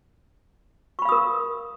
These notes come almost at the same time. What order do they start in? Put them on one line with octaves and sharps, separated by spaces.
C#6 B5 F5 D#6 A#4